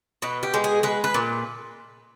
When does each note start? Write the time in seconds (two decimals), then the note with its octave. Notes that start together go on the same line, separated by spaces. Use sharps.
0.22 B2 B4
0.43 G4
0.54 G#3
0.64 G#4
0.83 G#3 B4
1.04 B4
1.14 A#2